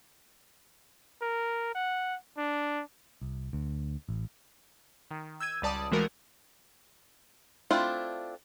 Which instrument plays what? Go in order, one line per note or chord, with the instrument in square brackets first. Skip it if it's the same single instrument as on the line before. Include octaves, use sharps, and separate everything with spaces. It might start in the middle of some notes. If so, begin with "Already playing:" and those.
[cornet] A#4
F#5
D4
[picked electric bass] C2
D2
A1
[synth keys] D#3
E6 G6 G#6 D#7
C#2 G3 D5 A5 D#6
E3 F3 G#3 A3 F#4 A#4
[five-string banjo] A3 C4 D4 E4 F4